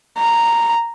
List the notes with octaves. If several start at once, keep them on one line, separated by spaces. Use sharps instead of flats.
A#5